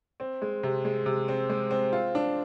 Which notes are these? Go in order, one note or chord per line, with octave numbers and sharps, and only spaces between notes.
C4
G#3
C3
G#3
C3
C4
G#3
C4
F4
D4